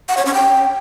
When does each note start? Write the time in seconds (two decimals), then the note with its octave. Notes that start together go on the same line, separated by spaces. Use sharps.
0.09 F#5
0.17 C#5
0.25 C#4
0.34 G5